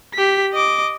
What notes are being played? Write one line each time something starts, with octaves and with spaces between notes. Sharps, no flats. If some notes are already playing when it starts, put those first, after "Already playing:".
G4 B6
D#5 D6